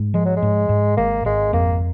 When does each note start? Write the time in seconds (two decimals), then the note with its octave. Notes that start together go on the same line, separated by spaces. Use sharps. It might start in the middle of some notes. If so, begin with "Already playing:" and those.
Already playing: G#2
0.14 F3 G#3
0.25 F#3
0.36 G#3
0.42 G#2
0.69 G#2
0.97 G#1 A#3
1.25 G#1 G#3
1.53 F2 A#3